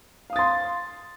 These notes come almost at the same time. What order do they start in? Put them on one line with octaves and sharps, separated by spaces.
F5 D#6 A6 C6